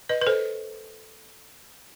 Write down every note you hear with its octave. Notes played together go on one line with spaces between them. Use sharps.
B4 D#5
B4
A4 C5